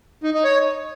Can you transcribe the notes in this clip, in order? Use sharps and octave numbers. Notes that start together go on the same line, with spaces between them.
D#4
D#4
C#5